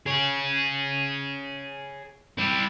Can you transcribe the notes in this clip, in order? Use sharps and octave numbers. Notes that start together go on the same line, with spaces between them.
G#4 C#5
G3 E4